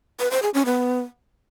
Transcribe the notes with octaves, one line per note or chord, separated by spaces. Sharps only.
B4
C5
G#4
C#4
B3